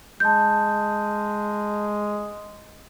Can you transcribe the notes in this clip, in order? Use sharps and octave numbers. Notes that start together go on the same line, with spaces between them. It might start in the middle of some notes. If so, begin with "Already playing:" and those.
G#3 A5 G6